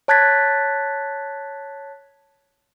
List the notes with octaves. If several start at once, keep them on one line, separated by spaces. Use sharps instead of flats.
C#5 A5 F#6 G#6 A6 B6